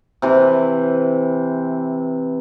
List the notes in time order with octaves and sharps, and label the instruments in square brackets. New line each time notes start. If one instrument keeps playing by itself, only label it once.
[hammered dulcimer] C3 E3